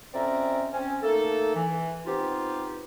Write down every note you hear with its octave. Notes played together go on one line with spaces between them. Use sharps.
F2 C4 C#4 D5 E5 A#5
C4 C#4
A3 A#3 D#4 A4
E3
B3 C4 D#4 F4 G4